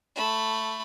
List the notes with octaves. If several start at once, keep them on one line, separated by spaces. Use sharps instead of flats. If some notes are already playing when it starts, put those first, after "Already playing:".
A3 B5